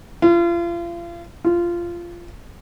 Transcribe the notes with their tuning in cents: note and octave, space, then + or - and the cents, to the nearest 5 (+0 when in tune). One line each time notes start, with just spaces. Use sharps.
F4 -35
F4 -15